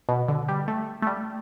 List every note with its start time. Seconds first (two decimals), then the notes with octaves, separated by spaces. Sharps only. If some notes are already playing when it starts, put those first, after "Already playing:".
0.09 B2
0.28 D3
0.48 G3
0.68 A3
1.02 A3
1.07 G3